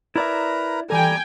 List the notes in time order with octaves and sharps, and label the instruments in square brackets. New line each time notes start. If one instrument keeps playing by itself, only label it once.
[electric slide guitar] E4 D5 E5 [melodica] A#4 B4 A#5
[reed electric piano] E3 A4 [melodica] G3 A#5 [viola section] G5 G#5